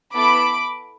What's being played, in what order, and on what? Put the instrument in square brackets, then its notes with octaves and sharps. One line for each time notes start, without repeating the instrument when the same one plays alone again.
[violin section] B3 E4 A4 B5 D6